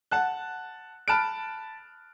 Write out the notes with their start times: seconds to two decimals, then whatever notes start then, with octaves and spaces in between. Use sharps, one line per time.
0.11 F#5 A5 F#6
1.08 A5 B5 F6 F#6 D7